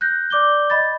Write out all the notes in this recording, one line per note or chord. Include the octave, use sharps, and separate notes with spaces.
F#6 G6 A#6
D5 D6 G6 G7
D#5 B5 A6